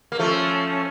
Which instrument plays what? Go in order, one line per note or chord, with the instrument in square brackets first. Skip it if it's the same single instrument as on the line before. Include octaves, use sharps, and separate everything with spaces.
[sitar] A#3
[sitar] F3 A3 [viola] C#4